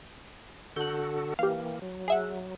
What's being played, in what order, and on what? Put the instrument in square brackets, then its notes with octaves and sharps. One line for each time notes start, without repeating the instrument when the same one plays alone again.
[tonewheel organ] D3 F#4 A4 [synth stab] F#6 G6
[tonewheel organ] E3 A#3 [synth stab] G4 F5
[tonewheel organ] F#3
[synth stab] G#4 E5 F#5